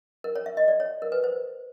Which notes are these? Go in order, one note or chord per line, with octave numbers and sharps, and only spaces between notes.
A#4
C#5
E5
D#5
D5
C#5
A#4
B4
C5